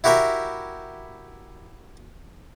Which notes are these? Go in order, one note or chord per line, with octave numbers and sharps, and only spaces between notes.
E4 F#4 G4 A#4 E5